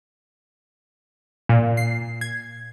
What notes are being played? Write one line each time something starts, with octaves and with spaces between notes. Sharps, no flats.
A#2
C7
G#6